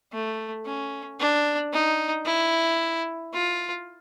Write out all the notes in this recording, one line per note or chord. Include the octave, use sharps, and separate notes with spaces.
A3
C#4
D4
D#4
E4
F4